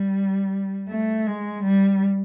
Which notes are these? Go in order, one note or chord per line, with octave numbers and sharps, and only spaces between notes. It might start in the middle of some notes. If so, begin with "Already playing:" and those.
Already playing: G3
A3
G#3
G3